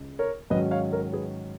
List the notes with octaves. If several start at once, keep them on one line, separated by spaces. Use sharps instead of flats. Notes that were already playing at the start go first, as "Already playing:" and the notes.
Already playing: C#2 C#3 G#3
A#4 C#5
G#2 D#3 F#3 C#4 B4 D#5
C#5 F5
A#4 C#5
G#4 B4